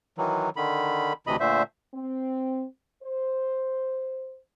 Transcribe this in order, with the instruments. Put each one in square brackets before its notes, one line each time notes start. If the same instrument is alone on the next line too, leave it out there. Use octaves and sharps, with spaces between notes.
[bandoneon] D#3 E3 F#3
D3 D#3 B5
D2 C3 E3 D#5 B5
A#2 D3 A3 C5 E5
[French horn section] C4
C5